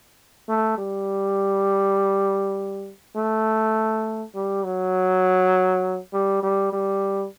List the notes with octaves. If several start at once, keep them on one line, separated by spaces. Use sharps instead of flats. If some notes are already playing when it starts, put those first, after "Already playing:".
A3
G3
A3
G3
F#3
G3
G3
G3